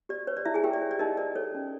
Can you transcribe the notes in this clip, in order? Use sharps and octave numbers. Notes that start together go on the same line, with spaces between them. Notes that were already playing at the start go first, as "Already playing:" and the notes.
G4 D5
B4 C#5
D5
D#4 E4 E5
G#4 G#5
G4 A#4 G5
D5
C#5
D5
D#4 A#4 D#5
A#4 D5
A4 C#5
C#4